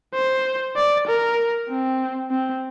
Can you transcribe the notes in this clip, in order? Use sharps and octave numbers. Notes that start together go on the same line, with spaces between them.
C5
D5
A#4
C4
C4